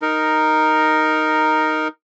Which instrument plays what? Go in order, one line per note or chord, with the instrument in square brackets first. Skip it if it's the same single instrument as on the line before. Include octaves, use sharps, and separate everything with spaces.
[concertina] D#4 A#4